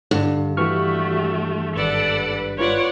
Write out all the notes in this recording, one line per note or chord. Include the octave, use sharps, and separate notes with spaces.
G2 D3
E3 A3 F#4 G4 C#6 F6
G#1 A4 B4 D5 F#5
F4 B4 C#5 D5 F#5